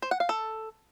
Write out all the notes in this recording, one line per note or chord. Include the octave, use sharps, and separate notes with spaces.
C5
F#5
F5
A4